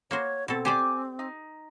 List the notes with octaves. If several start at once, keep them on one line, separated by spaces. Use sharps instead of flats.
A#3 F#4 C5 C#5
B2 C4 A4
G4 C5 D5 G#5 D6
D#4